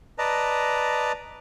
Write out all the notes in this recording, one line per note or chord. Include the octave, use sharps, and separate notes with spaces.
B4 D5 D#5 A5 A#5